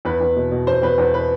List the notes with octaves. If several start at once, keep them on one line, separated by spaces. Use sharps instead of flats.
E2 B4
E2
B2
B2
E2 C5
E2 B4
E2 C5
B4